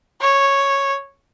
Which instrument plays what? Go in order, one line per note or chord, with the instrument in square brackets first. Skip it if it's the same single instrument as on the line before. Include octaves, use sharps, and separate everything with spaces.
[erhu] C#5